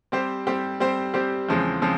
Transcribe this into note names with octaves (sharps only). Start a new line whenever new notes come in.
G3 C4 G4 C5
G3 C4 G4 C5
G3 C4 G4 C5
G3 C4 G4 C5
E2 C#3 F3 G#3 C4
C#3 F3 G#3 C4